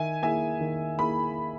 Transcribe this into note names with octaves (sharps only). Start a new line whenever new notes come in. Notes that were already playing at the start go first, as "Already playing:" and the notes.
Already playing: D#3 E5 G#5
A#3 E4 G#4 E5 G#5
D#3
A#3 E4 G#4 B5